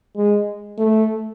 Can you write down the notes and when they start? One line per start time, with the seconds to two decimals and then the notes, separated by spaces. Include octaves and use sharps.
0.17 G#3
0.78 A3